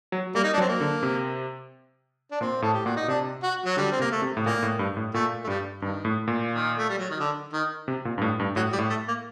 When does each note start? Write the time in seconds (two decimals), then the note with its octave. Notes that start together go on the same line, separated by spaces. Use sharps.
0.12 F#3
0.35 G3 A#3
0.43 D#4
0.53 D4
0.58 F#3
0.61 C4
0.69 A#3
0.81 D3
1.03 C3
2.31 D4
2.41 A#2 C4
2.62 A2 A4
2.73 G4
2.85 A#2 F#4
2.96 D#4
3.08 C3 D4
3.43 F#4
3.66 F#3
3.77 D3 G3
3.92 C4
3.99 C3 A#3
4.11 A3
4.22 C3
4.37 A2
4.46 A#2 A#3
4.63 A2
4.79 G2
4.97 A2
5.14 A#2 A3
5.44 A3
5.47 G2 G3
5.82 G2 D#3
6.05 A2
6.28 A#2
6.51 D#3
6.78 A3
6.89 G3
6.98 F#3
7.10 D#3
7.20 D3
7.53 D#3
7.88 C3
8.05 A#2
8.18 G2
8.22 A2
8.40 G2
8.56 A2 F#3
8.73 G3
8.79 A2
8.90 A3
9.08 A#3